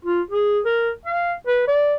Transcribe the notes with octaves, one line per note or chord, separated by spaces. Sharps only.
F4
G#4
A#4
F5
B4
D5